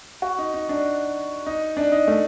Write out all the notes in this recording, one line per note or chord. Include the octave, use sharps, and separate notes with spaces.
F#4
D#4
D#4
D4
D#4
D4
D#4
A3